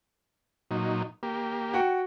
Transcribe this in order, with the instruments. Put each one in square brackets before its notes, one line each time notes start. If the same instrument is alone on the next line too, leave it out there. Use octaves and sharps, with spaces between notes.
[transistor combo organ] A#2 F#3 D#4
A#3 G4
[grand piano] F#4 G5